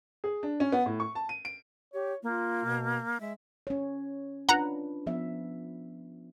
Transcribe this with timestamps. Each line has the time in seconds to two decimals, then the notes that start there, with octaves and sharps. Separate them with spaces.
0.24 G#4
0.43 D4
0.60 C#4
0.72 B3
0.86 A2
1.00 C#6
1.15 A5
1.29 D#7
1.45 D7
1.94 G4 C#5
2.23 A#3 F4
2.65 B2
3.20 G#3 E5
3.67 C#4 C#5
4.49 D4 F4 B4 F#5 A#5
5.06 F3 B3 E5